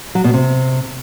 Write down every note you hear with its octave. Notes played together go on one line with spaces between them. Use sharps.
F#3
B2
C3